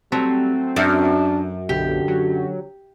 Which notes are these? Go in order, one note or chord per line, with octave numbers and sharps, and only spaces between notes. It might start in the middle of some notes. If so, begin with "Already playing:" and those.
F#3 G3 A3 C4
F#2 D4
B1 D3 G4
F#3